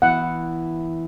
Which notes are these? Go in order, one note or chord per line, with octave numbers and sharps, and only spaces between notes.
E3 B3 E4 F#5